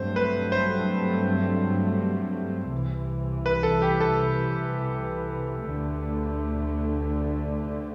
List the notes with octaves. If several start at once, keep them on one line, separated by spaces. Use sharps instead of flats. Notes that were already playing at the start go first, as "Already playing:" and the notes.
Already playing: G2 F#3 A3 C4 C5
B4
C5
C2 C3 E3
B4
A4
G4
A4
D2 D3 A3